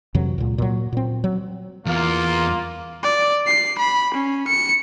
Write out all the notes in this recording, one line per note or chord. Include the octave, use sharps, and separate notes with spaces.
F2 C3 E3 F#3
C#2 A#2
A#2 F#3
A#2 C4
F#3
E2 A#3 F4
D5
C7
B5
C#4
C#7